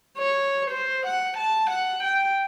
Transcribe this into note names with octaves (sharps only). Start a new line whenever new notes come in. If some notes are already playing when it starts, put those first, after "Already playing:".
C#5
C5
F#5
A5
F#5
G5